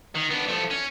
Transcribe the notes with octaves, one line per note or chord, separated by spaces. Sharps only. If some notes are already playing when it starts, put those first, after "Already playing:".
D#3
B3 D4
F3 A3
C#4